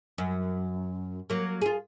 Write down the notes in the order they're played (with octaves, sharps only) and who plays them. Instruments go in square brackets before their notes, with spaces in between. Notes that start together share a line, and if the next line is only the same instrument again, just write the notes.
[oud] F#2
F#3 A#3
F4 G#4